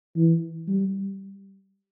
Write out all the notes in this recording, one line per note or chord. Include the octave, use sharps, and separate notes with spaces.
E3
G3